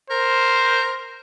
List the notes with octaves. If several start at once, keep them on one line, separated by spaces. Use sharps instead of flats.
A#4 C5